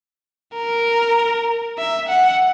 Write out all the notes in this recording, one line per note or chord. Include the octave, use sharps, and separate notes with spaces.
A#4
E5
F#5